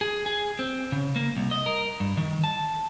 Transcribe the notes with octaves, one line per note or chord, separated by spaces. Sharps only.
G#4
G#4
C4
C#3
A#3
C2
D#5
A#4
G2
D#3
A5